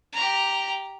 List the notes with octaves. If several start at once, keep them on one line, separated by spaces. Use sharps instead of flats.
G4 A#5